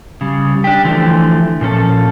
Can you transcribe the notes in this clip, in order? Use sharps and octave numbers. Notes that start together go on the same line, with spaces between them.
C#3 G3
D4 G4
D3 E3 F3 A3
A#2 F3 C#4 A4